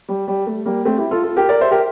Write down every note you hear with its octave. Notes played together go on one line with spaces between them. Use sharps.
G3
G3
A3
G3 A#3
A3 C4
E4 G4
F4 A4
F4 A4
G4 A#4
A#4 D5
C5 E5
G4 A#4